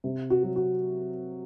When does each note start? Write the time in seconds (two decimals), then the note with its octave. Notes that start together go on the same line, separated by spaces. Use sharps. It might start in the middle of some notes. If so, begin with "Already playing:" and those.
0.04 C3
0.30 F#4
0.43 F#3
0.56 F#4